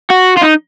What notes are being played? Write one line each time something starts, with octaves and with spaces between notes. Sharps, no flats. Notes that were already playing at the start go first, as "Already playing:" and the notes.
F#4
F4
D#4